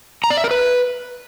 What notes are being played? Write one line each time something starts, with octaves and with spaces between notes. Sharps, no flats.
A#5
D5
E5
A#4
B4